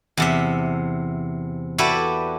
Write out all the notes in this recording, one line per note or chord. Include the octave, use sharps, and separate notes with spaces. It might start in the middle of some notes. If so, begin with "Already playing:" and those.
E2 C3 E5
E4 F#4 G4 A4 B4 D5